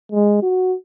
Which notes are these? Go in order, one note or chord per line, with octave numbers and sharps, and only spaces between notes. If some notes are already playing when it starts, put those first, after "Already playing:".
G#3
F#4